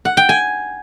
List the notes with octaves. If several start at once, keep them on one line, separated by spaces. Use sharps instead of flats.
F#5
G5
G#5